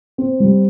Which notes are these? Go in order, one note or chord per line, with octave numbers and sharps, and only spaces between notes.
C4
G3